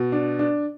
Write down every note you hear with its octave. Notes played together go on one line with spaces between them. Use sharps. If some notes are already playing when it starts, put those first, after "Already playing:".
Already playing: B2
D4
D4